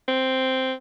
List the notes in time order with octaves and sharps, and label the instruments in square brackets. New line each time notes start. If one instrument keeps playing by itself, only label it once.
[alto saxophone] C4